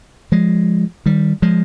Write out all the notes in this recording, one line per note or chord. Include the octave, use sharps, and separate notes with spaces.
F3 G#3
D#3 G3
F3 G#3